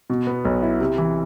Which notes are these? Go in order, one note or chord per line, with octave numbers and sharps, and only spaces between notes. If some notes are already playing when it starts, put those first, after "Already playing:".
B2
B3
B1
E4
C3
E3